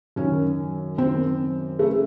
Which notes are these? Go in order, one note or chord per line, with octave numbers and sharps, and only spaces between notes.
F#2 D#3 C#4
F#2 D#3 C4
C#3 A3